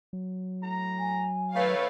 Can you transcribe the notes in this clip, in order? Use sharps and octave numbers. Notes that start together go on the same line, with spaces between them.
F#3
A2 A#5
G#5
D#3 A3 B4 C#5 F5